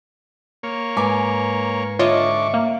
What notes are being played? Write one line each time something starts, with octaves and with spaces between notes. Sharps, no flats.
A#3 C#5
G#2 B4 G#5 D6
D3 F4 C#5 D#5 E5 C#6 D6
A#3